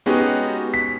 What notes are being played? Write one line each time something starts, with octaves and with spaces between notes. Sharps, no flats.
G#3 B3 C#4 D#4 F#4 G4
B6